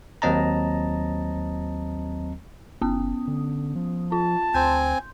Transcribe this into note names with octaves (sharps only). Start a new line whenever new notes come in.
D#2 F#3 C4 D#5 A5 A#5
F#1 B3 C#4 D#6
D3
F3
F4 A5
D2 C4 G#5 C6 G6